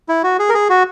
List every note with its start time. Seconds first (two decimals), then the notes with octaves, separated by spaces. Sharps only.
0.09 E4
0.23 F#4
0.39 G#4
0.49 A#4
0.54 G#4
0.69 F#4